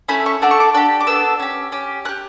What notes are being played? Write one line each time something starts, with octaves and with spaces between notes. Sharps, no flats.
A3 C#4 E4 B5
C#6
A3 D4 F#4 A4 D6
C#6
D6
D4 G4
D6
B3 D4 A4 E6
C#4 G4
C#4 G4
C#4 F#6
G4